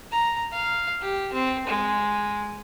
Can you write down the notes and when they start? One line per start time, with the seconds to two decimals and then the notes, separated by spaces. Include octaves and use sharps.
0.11 A#5
0.52 F5
1.01 G4
1.33 C4
1.67 G#3